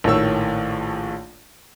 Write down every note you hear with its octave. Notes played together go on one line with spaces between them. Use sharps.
A#1 A2 D#3 C#5 E6